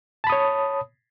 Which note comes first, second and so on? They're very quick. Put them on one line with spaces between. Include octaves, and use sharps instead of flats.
A5 B5 D#6 C#5